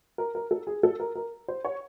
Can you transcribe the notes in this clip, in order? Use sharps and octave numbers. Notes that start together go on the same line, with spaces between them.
A#4
A#4
A4
G#4
A4
A#4
A#4
C5
C#5